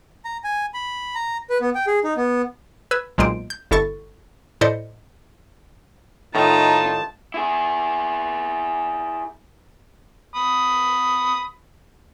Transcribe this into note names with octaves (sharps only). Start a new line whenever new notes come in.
A#5
G#5
B5
A#5
B4
B3
G5
G#4
D#4
B3
B4 E6 G#6
B1 A#2 G#3 C5 D7
G6
G1 E4 A4 C#6 A6
A2 E4 C5 D5 D#5 C#7
A2 D#3 D#4 F4 A5 A#5
E4 G#4
B5 D#6